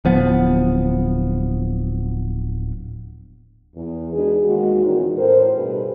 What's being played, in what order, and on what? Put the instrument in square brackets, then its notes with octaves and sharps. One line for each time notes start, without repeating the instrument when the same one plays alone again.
[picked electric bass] D1 F3 B3
[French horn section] E2
G#3 D4 D#4 F#4 G#4 B4
D#2 D#3 G#3 F#4
E2 A#2 D#3 E3 C#4 F4
A2 A#4 C5
G2 B2 G#4 B4